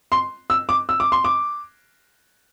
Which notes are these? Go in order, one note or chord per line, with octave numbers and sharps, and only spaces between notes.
C6
E6
D6
E6
D6
C6
D6